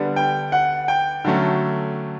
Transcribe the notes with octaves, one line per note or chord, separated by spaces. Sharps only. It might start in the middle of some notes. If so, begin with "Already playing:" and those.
Already playing: D3 G3 B3 D4
G5
F#5
G5
D3 F#3 A3 C#4